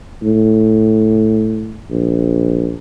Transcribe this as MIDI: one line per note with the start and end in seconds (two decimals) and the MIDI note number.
0.23 1.82 45
1.90 2.75 34